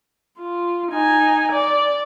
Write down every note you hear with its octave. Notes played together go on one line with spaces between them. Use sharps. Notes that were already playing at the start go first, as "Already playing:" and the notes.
F4
D#4 G#5
D5